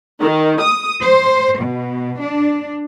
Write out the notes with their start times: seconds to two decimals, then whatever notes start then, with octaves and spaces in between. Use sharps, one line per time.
0.20 D#3
0.61 D#6
1.02 C5
1.61 B2
2.20 D4